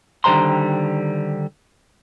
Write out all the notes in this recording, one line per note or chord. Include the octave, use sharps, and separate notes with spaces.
D3 D#3 G3 C5 A#5 C6